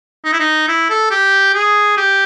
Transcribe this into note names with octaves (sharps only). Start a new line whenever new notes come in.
D#4
E4
D#4
E4
A4
G4
G#4
G4